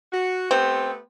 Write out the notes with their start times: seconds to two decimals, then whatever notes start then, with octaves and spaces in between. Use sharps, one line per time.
0.13 F#4
0.51 A3 B3 C4 G4